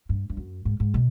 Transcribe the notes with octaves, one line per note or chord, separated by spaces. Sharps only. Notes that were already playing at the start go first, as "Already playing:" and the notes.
G2
G2
F#2
G#2
G#2
B2